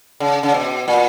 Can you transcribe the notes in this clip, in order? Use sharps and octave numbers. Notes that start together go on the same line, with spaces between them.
C#3
C#3
B2
A#2